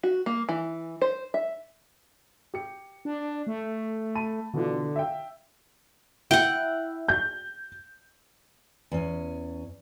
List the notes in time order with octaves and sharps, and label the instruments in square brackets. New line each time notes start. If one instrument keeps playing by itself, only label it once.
[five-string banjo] F#4
A#3
E3
C5
E5
[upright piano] G4 C#7
[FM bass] D4
A3
[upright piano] A5 B5 D#7
[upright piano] B2 E3 F4 [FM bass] D3
[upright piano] E5 F5 G5
[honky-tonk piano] E4 [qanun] F#5 G5
[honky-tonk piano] G6
[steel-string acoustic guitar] E2 C#4